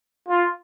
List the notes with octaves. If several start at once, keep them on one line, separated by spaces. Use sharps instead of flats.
F4